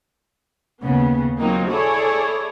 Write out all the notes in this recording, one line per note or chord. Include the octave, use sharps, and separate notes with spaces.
D#2 C#3 B3
F#3 A#3 C4 D#4 F4
E4 G#4 A4 C#5 D5